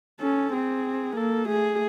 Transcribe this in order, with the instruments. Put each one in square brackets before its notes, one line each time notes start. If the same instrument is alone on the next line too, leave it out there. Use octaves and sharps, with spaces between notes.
[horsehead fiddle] C#4 [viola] A4
[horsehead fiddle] C4 [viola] G#4
[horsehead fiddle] A#3 [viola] A4
[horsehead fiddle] A3 [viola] G#4